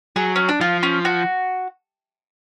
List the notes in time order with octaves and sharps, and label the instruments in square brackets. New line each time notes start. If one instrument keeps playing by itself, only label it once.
[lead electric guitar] F#3 [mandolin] G#4
[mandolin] C#4
D4
[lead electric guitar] F3 [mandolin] F4
[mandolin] C#4
F#4